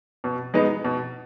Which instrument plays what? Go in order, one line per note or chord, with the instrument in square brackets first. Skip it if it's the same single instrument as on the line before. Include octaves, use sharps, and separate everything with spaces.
[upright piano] B2
G#3 B3 D#4
B2